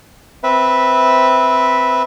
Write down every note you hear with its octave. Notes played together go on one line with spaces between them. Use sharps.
C4 B4 E5